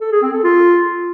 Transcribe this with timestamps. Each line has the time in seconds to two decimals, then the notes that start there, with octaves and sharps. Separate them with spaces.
0.01 A4
0.12 G#4
0.22 C4
0.33 A4
0.44 F4